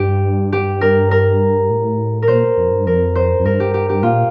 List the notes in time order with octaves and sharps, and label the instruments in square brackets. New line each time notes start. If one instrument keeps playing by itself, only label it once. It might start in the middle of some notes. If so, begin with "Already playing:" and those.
Already playing: [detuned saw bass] G2 [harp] G4
[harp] G4
A#4
A#4
[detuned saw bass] A2
[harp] A#4
[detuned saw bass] A#2 [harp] C5
[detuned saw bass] F2
G2
[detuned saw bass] F2 [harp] A#4
[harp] C5
[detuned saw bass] F2
[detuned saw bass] G2 [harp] A#4
[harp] G4
G4
G4
[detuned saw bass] A#2 [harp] F4